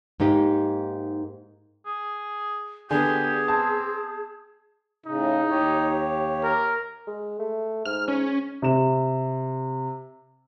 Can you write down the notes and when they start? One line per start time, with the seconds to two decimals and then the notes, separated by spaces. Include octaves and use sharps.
0.20 G#2 A#3 D#4 G4
1.86 G#4
2.91 D3 B3 G4 G#4 G#5
3.48 C4 A5
5.06 A2 C#3 D#4
5.49 D#2 G4 C#5
6.43 A#4
7.07 G#3
7.39 A3
7.85 G#2 F6
8.08 C#4
8.62 C3 E7